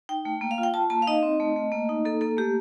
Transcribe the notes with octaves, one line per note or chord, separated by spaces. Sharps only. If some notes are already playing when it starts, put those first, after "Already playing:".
D#4 G5
A3
A#3
F5
F4
G5
F4 A5
A#3 A5
F5
D#4 D#5
C4
A3
A3
A#3
D#4
A#3 A4
A#3 A4
A3 G4